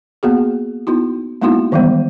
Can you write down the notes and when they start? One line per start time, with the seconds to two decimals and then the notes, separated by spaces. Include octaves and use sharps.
0.23 A#3 B3 F#4 G#4
0.87 B3 D#4 E4 F#4
1.42 G#3 A#3 B3 D#4 E4 F#4
1.72 D#3 E3 G3 G#3 B3